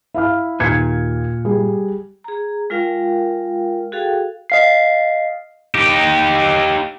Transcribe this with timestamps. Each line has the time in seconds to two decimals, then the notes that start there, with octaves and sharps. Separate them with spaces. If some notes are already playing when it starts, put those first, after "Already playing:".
0.14 E4 F5 F6
0.60 D#2 A#2 G#6 C#7
1.45 G3 G#4
2.24 G#4 A#5
2.70 G#3 F4 A#4 F5 G5
3.92 F#4 G#4 A4 F5 G5
4.50 D#5 F5 C7
5.75 D#4 G4